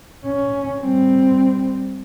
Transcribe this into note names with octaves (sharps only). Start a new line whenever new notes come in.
C#4
G3 C4